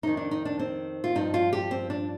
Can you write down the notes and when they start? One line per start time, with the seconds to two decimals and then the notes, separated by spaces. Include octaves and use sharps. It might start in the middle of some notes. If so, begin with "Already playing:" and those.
0.03 F2 D#3 D#4
0.17 D4
0.31 D#4
0.45 D4
0.59 C4
1.04 F4
1.15 G2 F3 D#4
1.34 F4
1.53 G4
1.71 C4
1.90 D4